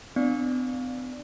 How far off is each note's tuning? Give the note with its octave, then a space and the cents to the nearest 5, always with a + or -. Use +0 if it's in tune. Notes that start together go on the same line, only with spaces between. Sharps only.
B3 +45 D4 +15 D5 +0